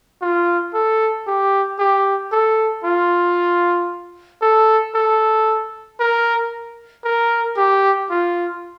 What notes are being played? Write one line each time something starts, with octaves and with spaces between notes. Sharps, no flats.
F4
A4
G4
G4
A4
F4
A4
A4
A#4
A#4
G4
F4